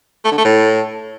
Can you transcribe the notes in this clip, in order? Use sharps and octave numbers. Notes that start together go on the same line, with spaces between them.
A3
D3
A3
A2